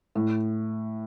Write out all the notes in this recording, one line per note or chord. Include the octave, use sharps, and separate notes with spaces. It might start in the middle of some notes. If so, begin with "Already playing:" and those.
A2